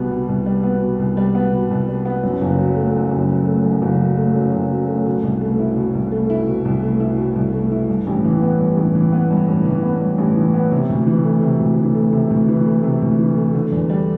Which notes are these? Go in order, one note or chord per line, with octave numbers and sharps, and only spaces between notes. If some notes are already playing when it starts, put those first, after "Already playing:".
Already playing: C2 B2 G3 B3
B2
C2
G3
B3
B2
C2
G3
B3
B2
C2
G3
B3
F#2
F#1
F#3
A3
F#2
F#1
F#3
A3
F#2
F#1
F#3
A3
F#2
F#1
F#3
A3
B2
C2
A3
E4
B2
C2
A3
E4
B2
C2
A3
E4
B2
C2
A3
E4
G2
A1
E3
B3
G2
A1
E3
B3
G2
A1
E3
B3
G2
A1
E3
B3
C3
D2
E3
A3
C3
D2
E3
A3
C3
D2
E3
A3
C3
D2
E3
A3
D3
E2
G3